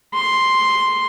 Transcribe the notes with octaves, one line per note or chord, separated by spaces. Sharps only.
C6